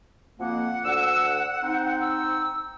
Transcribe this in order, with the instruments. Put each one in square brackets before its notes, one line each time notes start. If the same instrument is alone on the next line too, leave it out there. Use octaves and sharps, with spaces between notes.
[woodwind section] F2 A#3 [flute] F#5
[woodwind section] D2 D3 E6
C4 D#4
[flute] E6